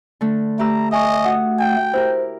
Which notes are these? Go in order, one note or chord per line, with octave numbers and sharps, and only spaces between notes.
D3 A3
A3 G4 B4 A#5 E6
D#5 E5 G#5 C#6
F#4 F#5 D#6
G5
E4 G4 A#4 C5